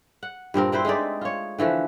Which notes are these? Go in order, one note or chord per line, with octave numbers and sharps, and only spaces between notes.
F#5
G2 A#2 C4 A#4
C4 E4 B4 C5
G#3 A3 D#4 D5
F4 C#5
D3 E3 F3 A3